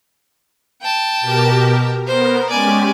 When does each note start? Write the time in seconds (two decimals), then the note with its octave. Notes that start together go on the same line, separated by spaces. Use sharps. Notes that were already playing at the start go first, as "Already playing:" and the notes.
0.81 G5 A5
1.21 B2 G4 A#4
2.07 B3 A#4 C5
2.49 G#3 C#4 G4 D5 G#5